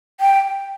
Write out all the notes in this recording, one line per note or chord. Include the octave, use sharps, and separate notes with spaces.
G5